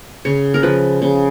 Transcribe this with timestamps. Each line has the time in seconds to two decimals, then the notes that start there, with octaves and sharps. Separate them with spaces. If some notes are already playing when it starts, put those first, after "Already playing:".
0.25 C#3 C#5
0.54 A#4
0.63 F3 B4
1.02 C#3